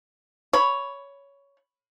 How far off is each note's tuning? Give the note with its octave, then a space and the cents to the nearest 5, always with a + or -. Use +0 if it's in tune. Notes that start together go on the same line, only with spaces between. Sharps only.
C#5 +10 B5 +0